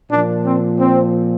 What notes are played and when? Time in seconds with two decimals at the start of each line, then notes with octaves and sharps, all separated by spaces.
0.11 A#2 F3 D4
0.45 C4
0.79 C4